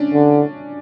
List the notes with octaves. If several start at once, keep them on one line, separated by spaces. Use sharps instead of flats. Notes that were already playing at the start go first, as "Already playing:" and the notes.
Already playing: C#4 D4
D3